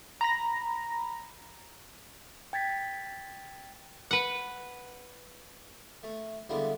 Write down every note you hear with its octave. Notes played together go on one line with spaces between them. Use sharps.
A#5 B5 A#6
G5 G#6 A6 B6
B4 F#5
A3
D3 G3 G#3 A#3 B3 E4